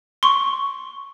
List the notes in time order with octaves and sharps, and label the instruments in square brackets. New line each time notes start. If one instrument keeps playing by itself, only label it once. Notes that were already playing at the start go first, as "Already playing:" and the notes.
[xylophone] C6 C#6